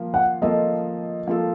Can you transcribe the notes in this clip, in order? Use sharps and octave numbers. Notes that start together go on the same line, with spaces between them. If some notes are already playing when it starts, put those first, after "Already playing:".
Already playing: F3 A#3 F4
F#5
F3 A#3 F4 A4 D#5
F3 A#3 F4 A4